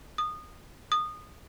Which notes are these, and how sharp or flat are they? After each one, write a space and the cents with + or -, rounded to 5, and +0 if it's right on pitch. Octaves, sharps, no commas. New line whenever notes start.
D#6 -20
D#6 -20